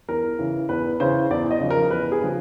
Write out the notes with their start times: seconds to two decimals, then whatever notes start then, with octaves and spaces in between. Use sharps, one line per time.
0.08 E2 A#4
0.39 C#3 E3
0.69 E2 B4
1.00 C#3 E3 C5
1.30 E2 D5
1.51 D#5
1.60 C#3 F3
1.70 A#4
1.91 E2 B4
2.12 G#4
2.21 C#3 F3